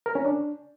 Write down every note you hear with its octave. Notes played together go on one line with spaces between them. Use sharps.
A#4
C#4
D4